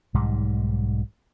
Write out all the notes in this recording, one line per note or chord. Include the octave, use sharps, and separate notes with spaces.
B1 G#2 D#3 G3